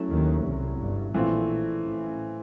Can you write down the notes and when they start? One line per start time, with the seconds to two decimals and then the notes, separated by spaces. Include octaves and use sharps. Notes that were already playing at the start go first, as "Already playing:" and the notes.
Already playing: F#3 A3 C#4 E4
0.11 D#2 D#3
0.45 C2 C3
0.79 G1 G2
1.14 A#1 A#2 E3 A3 C4 F4
1.82 A1 A2